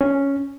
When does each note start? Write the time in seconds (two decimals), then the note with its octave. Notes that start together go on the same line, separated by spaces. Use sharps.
0.01 C#4